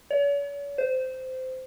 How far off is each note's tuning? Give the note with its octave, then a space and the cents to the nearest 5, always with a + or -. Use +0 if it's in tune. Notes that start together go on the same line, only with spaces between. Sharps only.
C#5 +45
C5 -15